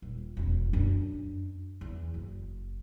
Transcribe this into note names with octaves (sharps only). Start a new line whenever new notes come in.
D#1
E1 C#4
F#2 D4
E2
F#1